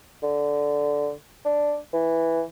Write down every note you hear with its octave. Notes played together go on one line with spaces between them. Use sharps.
D3
D4
E3